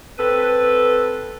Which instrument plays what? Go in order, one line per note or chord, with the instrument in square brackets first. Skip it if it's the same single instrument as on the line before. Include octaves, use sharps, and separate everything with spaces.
[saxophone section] C4 A4 B4